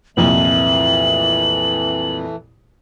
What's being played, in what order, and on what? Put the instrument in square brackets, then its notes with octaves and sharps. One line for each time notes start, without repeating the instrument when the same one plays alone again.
[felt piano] C2 F2 A#2 [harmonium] E3 A3 [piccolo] F#7